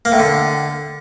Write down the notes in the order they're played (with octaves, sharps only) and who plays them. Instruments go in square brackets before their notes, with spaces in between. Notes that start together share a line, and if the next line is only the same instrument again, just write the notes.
[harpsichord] A#3
A2
D3